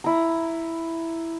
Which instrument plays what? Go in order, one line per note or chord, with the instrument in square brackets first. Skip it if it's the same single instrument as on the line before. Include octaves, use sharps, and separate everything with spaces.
[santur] E4 A#5